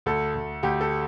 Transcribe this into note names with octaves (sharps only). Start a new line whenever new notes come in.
D2 A4
D2
D2 G4
A4